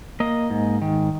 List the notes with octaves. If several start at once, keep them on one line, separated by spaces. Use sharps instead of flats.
A#3 D#5
G#2
D#3